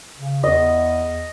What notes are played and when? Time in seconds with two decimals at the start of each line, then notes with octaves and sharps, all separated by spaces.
0.16 C#3
0.43 E2 D#5